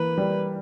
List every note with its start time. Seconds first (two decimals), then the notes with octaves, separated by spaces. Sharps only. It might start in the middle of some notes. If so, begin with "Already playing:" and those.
Already playing: E3 A#3 B4
0.18 G3